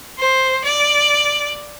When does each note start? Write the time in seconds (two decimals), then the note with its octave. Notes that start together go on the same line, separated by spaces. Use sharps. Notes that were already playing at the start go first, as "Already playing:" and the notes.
0.19 C5
0.65 D5